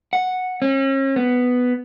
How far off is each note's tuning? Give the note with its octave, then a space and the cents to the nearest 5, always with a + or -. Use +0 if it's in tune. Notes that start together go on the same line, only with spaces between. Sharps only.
F#5 -5
C#4 -40
B3 +5